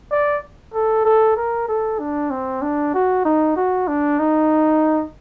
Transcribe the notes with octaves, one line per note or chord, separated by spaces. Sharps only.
D5
A4
A4
A#4
A4
D4
C4
D4
F#4
D#4
F#4
D4
D#4